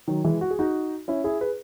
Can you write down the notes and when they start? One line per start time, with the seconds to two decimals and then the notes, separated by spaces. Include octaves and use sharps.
0.08 D#3 F#3
0.24 E3 G#3
0.41 F#4
0.51 G#4
0.59 D#4 F#4
1.08 C#4 E4
1.24 E4 G#4
1.41 G#4 B4